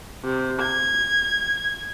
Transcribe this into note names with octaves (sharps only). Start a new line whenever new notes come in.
C3
G#6